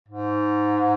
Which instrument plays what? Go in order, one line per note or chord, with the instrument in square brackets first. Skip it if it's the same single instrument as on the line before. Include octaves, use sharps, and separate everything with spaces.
[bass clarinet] G#2